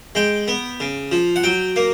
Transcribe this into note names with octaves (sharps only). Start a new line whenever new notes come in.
G#3 G5
B3
C#3
F3
F#5
F#3 G5
A#3